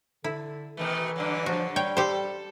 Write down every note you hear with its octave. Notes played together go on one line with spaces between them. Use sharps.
D3 E4
B2 D#3 E3 A3
G2 D3 F#3
F3 F#4
G3 C#5 G5
G4 A4 C5